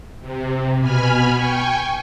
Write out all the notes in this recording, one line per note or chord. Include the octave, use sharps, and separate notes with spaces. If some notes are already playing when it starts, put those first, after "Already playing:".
C3
B2 G#5 B5 F6
G5 G#5 C#6